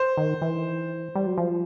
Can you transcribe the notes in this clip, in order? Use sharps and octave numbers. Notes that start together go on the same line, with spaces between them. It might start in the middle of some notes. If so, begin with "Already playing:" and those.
Already playing: C5
D#3
E3
G3
F#3
F3